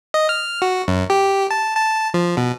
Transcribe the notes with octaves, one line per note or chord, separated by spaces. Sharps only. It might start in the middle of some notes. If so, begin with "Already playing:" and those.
D#5
F6
F#4
F#2
G4
A5
A5
F3
B2